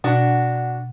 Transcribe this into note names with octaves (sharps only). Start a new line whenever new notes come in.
B2 D4 F#4 F#5